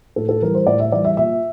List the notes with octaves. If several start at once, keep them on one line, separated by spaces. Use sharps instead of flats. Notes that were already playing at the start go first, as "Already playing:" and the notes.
A2 A4
A4
E3 G3 A#4
C5
A2 D5
E5
E3 G3 D5
E5
A#2 E5